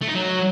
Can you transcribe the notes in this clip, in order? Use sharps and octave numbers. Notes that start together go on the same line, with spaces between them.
A3
D#4
F#3